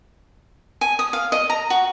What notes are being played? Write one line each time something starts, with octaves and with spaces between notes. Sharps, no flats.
G#5
D#6
F5
D#5
A#5
F#4